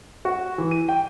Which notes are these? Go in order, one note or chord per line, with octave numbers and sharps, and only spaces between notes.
F#4
E3
D#7
G5